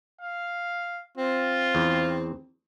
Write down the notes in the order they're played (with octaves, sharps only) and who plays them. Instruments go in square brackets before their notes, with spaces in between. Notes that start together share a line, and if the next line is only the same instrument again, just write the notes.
[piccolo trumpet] F5
[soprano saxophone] C4 [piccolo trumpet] F4
[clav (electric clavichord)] E2